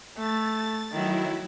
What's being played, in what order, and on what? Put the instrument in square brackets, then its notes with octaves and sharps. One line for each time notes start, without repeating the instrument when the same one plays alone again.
[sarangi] A3 [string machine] A6
[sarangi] D#3 [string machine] F#3 E4